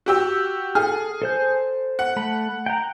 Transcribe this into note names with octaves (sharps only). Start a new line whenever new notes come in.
F#4 G4 E6
G#4 A4 F#5 F6
A4 C5 G6
F#5
A3 B5
G5 A#5